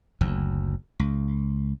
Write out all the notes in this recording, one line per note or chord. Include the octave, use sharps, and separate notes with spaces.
F#1 D2
C#2